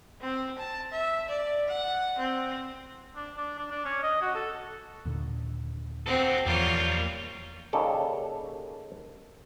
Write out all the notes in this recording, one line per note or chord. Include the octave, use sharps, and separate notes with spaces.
C4
A5
E5
D5
F#5
C4
D4
D4
D4
D4
C#4
D#5
F#4
A4
D#2 A#2 D3
C4 F#4 A4
E2 E3 F3 G3 A#3 F4 C#5
D#2 C#3 A4 D5